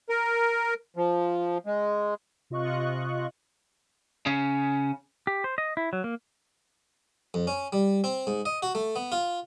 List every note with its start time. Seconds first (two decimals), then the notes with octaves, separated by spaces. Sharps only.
0.09 A#4
0.97 F3
1.66 G#3
2.50 C3 F4 D#5 C#6 F#6
4.26 C#3 C#4
5.27 G4
5.44 C5
5.58 D#5
5.77 E4
5.93 F#3
6.04 A#3
7.34 F2
7.47 C#4
7.73 G3
8.04 C4
8.27 G#2
8.46 D#5
8.63 F#4
8.75 A3
8.96 B3
9.12 F4